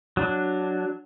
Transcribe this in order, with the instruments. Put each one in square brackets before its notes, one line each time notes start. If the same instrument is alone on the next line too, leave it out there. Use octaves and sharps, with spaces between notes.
[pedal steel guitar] F#3 D4